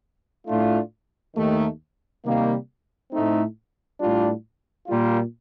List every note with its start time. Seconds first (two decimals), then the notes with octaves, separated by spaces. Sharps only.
0.47 A2 A3 D4 F4
1.35 D#2 D#3 A3
2.23 C3 D#3 G3 A#3
3.11 A2 A3 C4 D#4
3.99 A2 G3 D4 F4
4.87 A#2 G3 A#3 F4